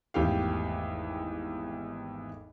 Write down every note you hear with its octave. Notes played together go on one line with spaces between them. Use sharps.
G#1 E2 A3 G4 F5